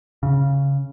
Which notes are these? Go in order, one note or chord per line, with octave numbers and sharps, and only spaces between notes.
C#3